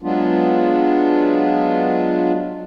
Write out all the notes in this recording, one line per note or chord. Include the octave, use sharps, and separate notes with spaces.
F#3 G#3 B3 D4 F4